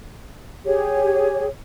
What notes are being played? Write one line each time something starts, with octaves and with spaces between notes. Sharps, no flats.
G4 G#4 C#5